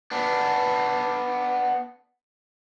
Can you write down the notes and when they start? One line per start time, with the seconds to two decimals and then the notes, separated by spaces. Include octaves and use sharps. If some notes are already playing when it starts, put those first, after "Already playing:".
0.11 B3 D4